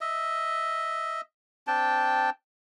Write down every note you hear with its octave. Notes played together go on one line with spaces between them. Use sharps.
D#5 E5
C4 D4 G5 A5